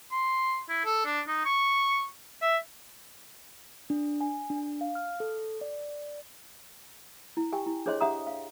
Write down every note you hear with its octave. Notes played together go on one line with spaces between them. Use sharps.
C6
E4
A4
D4
D#4
C#6
E5
D4
G#5
D4
F5
F6
A4
D5
E4
G4 G5 G#5
E4
D4 G#4 C5 C#5 D#5 C6
D4 G4 E5 F#5 A#5 D#6
F5